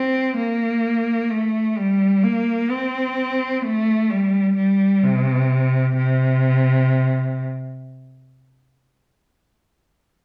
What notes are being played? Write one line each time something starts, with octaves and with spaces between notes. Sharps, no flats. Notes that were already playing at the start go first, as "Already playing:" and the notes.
Already playing: C4
A#3
A3
G3
A#3
C4
A3
G3
G3
C3
C3